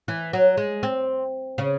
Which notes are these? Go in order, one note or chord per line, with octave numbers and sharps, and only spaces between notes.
E3
F#3
G#3
C4
C#3